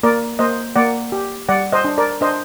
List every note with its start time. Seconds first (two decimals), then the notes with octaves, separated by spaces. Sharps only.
0.03 A#3 A#4 D5
0.39 A#3 C5 D#5
0.76 A#3 D5 F#5
1.12 G4
1.49 G3 D5 F#5
1.72 C5 D#5
1.85 D4
1.98 A#4 D5
2.21 D4 C5 D#5